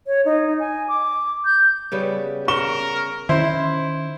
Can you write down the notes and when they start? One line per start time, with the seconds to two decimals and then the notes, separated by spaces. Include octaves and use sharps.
0.07 C#5
0.25 D#4
0.60 G#5
0.88 D6
1.45 G6
1.92 C#3 G3 B3
2.48 A#4 C#6 E7 G7
3.29 D#3 C#4 E4 C5